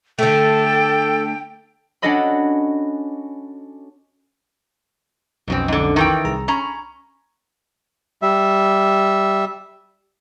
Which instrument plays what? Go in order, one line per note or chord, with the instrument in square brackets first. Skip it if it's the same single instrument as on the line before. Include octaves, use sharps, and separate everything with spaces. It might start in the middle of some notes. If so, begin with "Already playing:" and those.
[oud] D3 A3 [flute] A4 [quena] G5
[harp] C#4 D4 F#4 A4 D#5 B5
[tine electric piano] B1 F2 C#4 [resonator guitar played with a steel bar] G#2 B2 C4
[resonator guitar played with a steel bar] G#2 D3
D#3 E3 G5
[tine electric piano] C2 G#4 A#5
[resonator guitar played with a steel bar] C#4 A#5 [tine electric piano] B5
[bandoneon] G3 E5